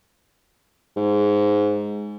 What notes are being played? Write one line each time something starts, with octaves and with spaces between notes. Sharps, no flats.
G#2